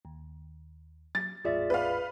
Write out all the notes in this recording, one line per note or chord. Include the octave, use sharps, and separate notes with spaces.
D#2
F#3 A6
G#1 E2 A2 F4 G#4 D5 E5
B4 F5